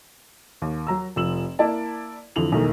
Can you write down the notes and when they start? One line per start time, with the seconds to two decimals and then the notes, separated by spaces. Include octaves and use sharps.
0.62 D#2
0.87 F#3 A#5 E6
1.16 F1 F3 E6 E7 F#7
1.59 A#3 E4 D5 A5
2.36 F2 D3 E3 F7 F#7
2.52 B1 E2 D#3 A3 A#3